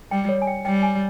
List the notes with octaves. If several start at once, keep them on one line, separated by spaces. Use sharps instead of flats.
G3 G5
C#5
G#5
G5
G3 G5
G#5